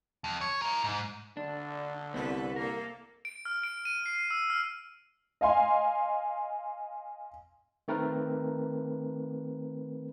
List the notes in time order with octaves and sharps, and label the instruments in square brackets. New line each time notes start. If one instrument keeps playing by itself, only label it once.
[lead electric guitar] F2
C#5
E4 A#4
G#2
[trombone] D3 [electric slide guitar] D4
[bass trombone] C2 [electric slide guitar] B3 C4 E4 [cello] A4 B4
[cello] A#3 A4 [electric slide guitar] A#4
[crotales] D7
F6
D7
D#7
C7
E6
F6
[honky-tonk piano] D#5 F5 G#5 C6
[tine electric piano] D#3 A3 C4 A#4 B4